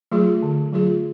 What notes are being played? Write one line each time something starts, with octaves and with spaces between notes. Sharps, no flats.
F#3 A3 F4 G#4
D3
F#3 A3 F4 G#4